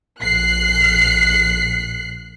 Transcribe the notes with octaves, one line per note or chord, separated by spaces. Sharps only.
A#1 F#6 C7